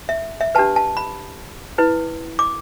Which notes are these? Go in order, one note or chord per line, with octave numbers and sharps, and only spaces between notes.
E5
E5
D4 G4 B4 A5
A5
B5
E4 B4
D6